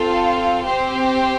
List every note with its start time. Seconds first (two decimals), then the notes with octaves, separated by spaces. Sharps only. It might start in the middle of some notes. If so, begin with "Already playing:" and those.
Already playing: C4 F4 A4
0.62 C4 G4 C5